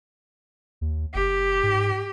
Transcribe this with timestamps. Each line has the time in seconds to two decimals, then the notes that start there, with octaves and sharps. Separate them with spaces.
0.81 D#2
1.15 F#1 G4
1.63 G#2